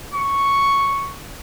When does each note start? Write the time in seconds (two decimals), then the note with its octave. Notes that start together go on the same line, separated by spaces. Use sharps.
0.14 C#6